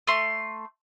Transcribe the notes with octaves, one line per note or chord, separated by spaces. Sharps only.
A3 C6